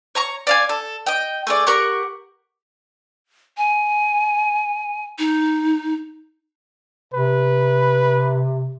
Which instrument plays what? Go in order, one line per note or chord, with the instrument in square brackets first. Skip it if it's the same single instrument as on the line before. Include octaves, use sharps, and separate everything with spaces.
[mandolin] C#5 A#5 C#6
D5 F5 G#5
A4
D#5 G5
A3 G#4 D5
G4 A#4 F#5 C#6
[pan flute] G#5
D#4
[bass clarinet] C3 [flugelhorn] B4